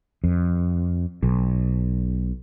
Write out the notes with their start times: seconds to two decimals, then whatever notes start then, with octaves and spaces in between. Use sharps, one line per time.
0.24 F2
1.23 B1